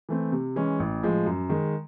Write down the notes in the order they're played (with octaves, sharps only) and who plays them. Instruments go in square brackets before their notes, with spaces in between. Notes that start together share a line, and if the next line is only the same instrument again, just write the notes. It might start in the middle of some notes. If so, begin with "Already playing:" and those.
[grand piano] E3 A3 C4
C3
E3 G#3 C#4
A1
A2 F3 G#3
F#2
D#3 G#3